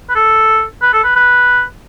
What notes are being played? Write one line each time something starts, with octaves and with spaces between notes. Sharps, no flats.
B4
A4
B4
A4
B4
B4